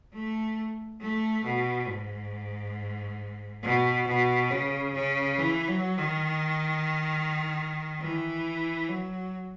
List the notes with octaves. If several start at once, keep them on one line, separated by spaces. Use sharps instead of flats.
A3
A3
B2
G#2
B2
B2
C#3
C#3
E3
F#3
D#3
E3
F#3